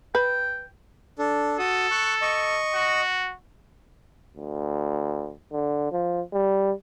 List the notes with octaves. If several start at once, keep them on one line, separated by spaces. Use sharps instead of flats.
B4 G5
D4 A4
F#4 A4 D#6
C#6 F#6
D#5 C#6
F#4
D2
D3
F3
G3